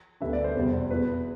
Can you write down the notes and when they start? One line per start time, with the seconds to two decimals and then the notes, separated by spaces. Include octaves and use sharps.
0.20 D2 D3 G3 B3 D4 E5
0.33 D5
0.44 C5
0.56 F1 E2 B2 G3
0.91 E2 B2 B3 E4 B4